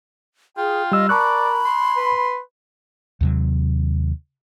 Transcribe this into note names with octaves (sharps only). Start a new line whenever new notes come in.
F4 G#4 G5
G3 D#5 E6
A#4 D5 A5 B5 C#6 F#6
C6
B4
D#2 C3 F#3